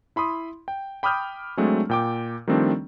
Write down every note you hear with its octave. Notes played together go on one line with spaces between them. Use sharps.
E4 B5 C6 D#6
G5
G5 B5 D6 D#6 F6 G6
F#3 G#3 A3 C4 D4
A#2 G5 D6
D#3 F3 G3 A3 C4 D4